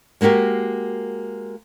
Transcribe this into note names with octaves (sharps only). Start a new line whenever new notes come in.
G#3 A#3 F#4 G4 A#4